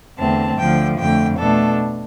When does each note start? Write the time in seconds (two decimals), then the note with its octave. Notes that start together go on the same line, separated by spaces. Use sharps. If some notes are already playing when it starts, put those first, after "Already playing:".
0.18 E2 D3 A3 C4 A5
0.58 D2 D3 F3 G5
0.99 F2 D3 A3 G5
1.38 B2 A3 D4 A4